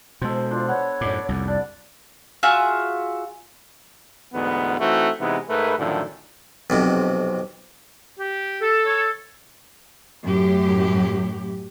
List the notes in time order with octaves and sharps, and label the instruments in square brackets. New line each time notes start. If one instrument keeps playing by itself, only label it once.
[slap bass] B2 G#3 [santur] A4 C5
[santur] D4 C5 [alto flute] F4
[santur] B3 F#5 [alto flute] C#5
[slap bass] F#2 A2 [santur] D5
[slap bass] C2 F2
[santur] D4 [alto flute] D5
[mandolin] F4 F#4 G#4 E5
[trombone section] D2 G#2 E3 B3
E3 A3 C4 D#4 F#4
C3 E3 G#3 B3 D#4
G#2 A3 A#4 B4
F#2 A2 D3 D#3 F3
[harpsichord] B1 F2 C3
[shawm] G4
[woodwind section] A4
[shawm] C#5
[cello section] F#2 A2 F#3 G4